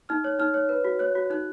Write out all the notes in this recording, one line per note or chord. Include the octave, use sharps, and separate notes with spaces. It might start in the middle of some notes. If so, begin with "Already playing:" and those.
D#4 F6
C#5
D#4 F6
C#5
B4
F#4
C#5 F#6
F#4
D#4 F#6